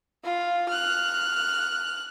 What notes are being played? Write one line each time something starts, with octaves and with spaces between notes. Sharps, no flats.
F4
F6 F#6